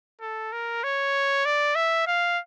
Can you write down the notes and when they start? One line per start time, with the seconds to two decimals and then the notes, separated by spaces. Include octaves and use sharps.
0.21 A4
0.52 A#4
0.84 C#5
1.45 D5
1.75 E5
2.07 F5